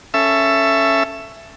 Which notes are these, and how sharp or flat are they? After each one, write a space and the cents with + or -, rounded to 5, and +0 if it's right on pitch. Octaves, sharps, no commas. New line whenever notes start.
C#4 +0 A4 +5 E5 +15